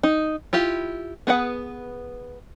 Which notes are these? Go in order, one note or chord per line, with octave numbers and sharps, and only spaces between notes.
D#4
E4 F4 G4
B3 G#4 B4 F#5